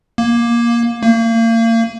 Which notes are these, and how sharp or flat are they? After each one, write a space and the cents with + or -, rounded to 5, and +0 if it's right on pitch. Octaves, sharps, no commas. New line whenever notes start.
A#3 +15
A#3 -35